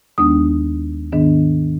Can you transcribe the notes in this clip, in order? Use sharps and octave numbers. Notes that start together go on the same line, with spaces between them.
D#2 D#3 G#3 B3 D4 D#6
G#2 D#3 B3 D4